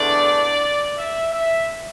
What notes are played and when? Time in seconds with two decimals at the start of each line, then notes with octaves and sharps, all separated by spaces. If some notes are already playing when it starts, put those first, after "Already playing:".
Already playing: E2 D3 A3 D4 D5
0.98 E5
1.32 E5